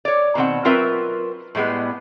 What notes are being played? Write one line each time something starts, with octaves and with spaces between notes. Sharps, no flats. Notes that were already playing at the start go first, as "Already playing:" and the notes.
C#5 D5
B2 D#3 C4 F#5
F#3 C4 F4 A#4 B4 E5
A2 G3 G#3 B3